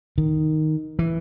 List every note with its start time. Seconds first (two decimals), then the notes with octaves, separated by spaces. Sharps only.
0.18 D#3
0.99 E3